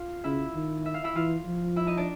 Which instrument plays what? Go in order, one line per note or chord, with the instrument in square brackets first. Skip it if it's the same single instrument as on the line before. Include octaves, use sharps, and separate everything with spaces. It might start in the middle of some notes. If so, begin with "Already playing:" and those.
Already playing: [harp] F4 F5
[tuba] C#3 [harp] E4 E5
[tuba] D#3
[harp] E5
F5
E4 E5
[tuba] E3 [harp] F4 F5
[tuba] F3
[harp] E4 E5
D#4 D#5
D4 D5